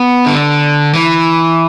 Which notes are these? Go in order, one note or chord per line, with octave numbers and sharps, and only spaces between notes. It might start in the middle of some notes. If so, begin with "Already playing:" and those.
Already playing: B3
D3
E3